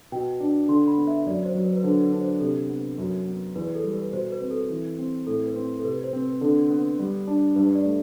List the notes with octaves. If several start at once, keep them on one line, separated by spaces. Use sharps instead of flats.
B2 G5
D4
D3 C6
B5
B3
E5
F#2 D5
C5
F#3
B4
B4
D3 C5
B4
D4
C5
C3 A4
B3
F#2
B3
E2 B4
A4
G3
B4
B2 C5
B4
C4
A4
E3
C4
A2 A4
B4
C4
A4
C3 B4
C5
C4
B4
D3 A4
B3
G3
D4
G2 B4
D5
A3